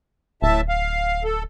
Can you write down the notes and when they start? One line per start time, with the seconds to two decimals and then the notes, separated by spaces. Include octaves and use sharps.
0.42 D1 A2 E5 A5
0.69 F5
1.24 A4